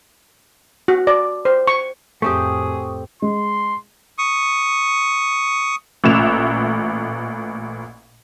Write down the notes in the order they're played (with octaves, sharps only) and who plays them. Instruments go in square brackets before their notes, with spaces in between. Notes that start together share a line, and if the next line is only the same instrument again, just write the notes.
[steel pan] F#4
D5
C5
C#6
[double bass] F2 A2 [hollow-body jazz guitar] A3 C4 G4 [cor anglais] G#4 [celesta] C#6 D#6
[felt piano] G#3 [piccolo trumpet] C6
[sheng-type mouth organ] C#6 D#6
[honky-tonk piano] A1 A#2 E5 E7 F7